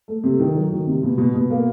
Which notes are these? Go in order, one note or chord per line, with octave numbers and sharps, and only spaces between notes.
A3
C3
D#3
F#3
D#3
C3
B2
B2
B2
A#3